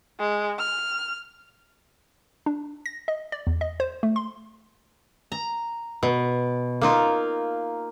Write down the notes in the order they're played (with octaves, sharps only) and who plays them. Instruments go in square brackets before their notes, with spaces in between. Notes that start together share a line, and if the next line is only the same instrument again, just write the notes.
[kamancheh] G#3
F6
[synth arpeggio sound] D4
A#6
D#5
D5
E2
D#5
C5
A3
C6
[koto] A#5
B2
A#3 D#4 F4